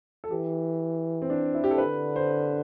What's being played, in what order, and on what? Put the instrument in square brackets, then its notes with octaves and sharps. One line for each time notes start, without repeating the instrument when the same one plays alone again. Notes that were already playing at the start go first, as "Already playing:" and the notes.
[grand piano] A4
[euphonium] E3 [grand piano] G4
[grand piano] C4
D4
E4
G4
A4
[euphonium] D3 [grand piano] B4
[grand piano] C5